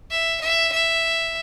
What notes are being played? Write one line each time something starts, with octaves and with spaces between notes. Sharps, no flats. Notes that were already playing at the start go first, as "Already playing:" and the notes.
E5
E5
E5